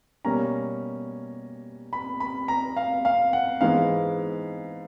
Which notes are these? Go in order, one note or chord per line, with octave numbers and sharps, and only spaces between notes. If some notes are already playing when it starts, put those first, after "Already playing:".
B2 G3 A#3 C#4 A#5
B5
B5
A#5
F5
F5
F#5
G#2 E3 G#3 B3 F5